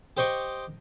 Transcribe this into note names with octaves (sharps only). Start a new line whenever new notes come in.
G4 C5 D#5 C#6 D6